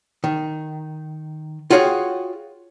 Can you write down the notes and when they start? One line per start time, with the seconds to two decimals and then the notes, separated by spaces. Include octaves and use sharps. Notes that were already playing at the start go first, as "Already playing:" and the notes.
0.24 D#3
1.70 F4 F#4 G#4 C#5 F5 G5